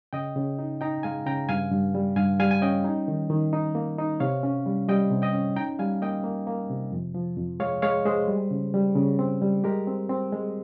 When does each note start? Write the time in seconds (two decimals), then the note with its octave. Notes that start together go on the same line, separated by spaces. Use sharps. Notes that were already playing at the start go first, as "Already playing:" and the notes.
0.13 C#3 D#5 G5
0.36 C#3
0.59 D#4
0.81 D#4 G5 A#5
1.03 G#3 F5 G#5
1.26 C#3 G5 A#5
1.49 G2 F5 G#5
1.71 G2
1.95 G3
2.16 G2 F5 G#5
2.39 G3 F5 G#5
2.51 G#5
2.62 C#4 D#5 G5
2.84 D#4
3.08 D#3
3.30 D#3
3.53 D#4
3.75 A#3
3.99 D#4
4.20 C3 C#5 F5
4.43 C#4
4.66 G3
4.89 G3 D#5 G5
5.11 C3
5.22 D#5 G5
5.33 C#4
5.56 D#4 G5 A#5
5.79 G3 F5 G#5
6.02 A#3 D#5 G5
6.24 A#3
6.47 A#3
6.69 C3
6.92 F2
7.14 F3
7.37 F2
7.60 G#3 C#5 F5
7.82 G#3 C#5 F5
8.05 G#3 G#4 C5
8.28 G3
8.51 C#3
8.74 G3
8.96 C#3
9.19 C4
9.42 G3
9.64 G#3 G4 A#4
9.87 C4
10.09 C4
10.32 G#3